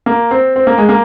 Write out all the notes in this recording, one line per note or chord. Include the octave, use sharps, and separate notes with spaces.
A#3
C4
C4
A#3
G#3
A#3